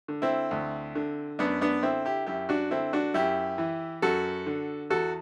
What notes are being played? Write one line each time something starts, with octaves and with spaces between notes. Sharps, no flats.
D3
C4 E4
D2
D3
F#2 B3 D4
B3 D4
D3 C4 E4
E4 G4
F#2 E4 G4
D4 F#4
D3 C4 E4
D4 F#4
F#2 E4 G4
E3
F#2 F#4 A4
D3
E2 F#4 A4